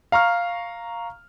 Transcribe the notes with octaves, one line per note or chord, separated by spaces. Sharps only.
F5 A#5 C#6 F6